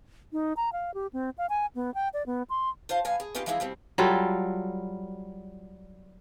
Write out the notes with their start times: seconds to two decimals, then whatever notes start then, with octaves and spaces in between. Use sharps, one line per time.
0.33 D#4
0.56 A#5
0.72 F5
0.94 G4
1.13 C4
1.38 F5
1.49 G#5
1.75 B3
1.94 G5
2.13 D5
2.26 B3
2.50 C6
2.89 F4 C5 F5 A5
3.05 G2 B3 F5 G#5
3.20 G#4
3.35 B3 C#4 D#4 F4 G4
3.46 E3 F3 G#3 C4 E4 G#4
3.60 B2 G3 C4
3.98 F#3 G3 F4 A4